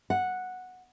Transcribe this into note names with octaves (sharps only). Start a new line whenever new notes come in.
F#5